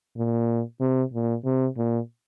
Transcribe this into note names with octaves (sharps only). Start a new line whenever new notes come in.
A#2
C3
A#2
C3
A#2